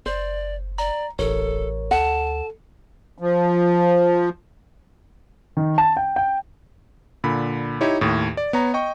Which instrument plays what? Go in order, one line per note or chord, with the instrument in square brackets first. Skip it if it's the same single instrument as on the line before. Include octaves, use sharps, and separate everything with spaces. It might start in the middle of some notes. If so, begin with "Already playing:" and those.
[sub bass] F#1 [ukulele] C5 [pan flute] D5
[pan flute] D5 [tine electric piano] A#5
[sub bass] D#1 [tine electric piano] A1 A#4 C#5 [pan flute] A4
[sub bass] D2 [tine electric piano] A4 [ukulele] F#5 [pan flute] A5
[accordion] F3
[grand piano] D#3
A5
G5
G5
[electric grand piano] A#2 D3 B5
D#4 E4 G4 C#5
D#2 A2
D5
B3 C#5 A#5
D#5 G5 C#6